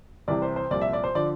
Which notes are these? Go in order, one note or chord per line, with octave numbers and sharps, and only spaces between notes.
C2 C3 E3 D5
C5
C5
C2 A#2 F3 D5
E5
D5
C5
D3 F3 D5